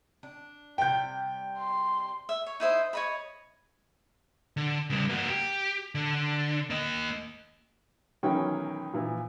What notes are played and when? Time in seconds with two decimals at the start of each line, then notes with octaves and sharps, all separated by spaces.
0.23 D4
0.78 C3 G3 G5 G6
1.58 C6
2.29 E5
2.46 C#5
2.60 D#4 E4 C5 D#6
2.93 C#5 D#5 B5
4.57 D3
4.90 C#3 G3
5.09 A#3 F#4
5.29 G4
5.95 D3
6.70 A#3 D#5
8.23 B1 D#3 E3 F#3 C#4 G5
8.93 A#2 E3 F3